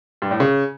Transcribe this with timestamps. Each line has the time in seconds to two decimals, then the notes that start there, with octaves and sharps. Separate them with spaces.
0.22 G2
0.31 A2
0.40 C#3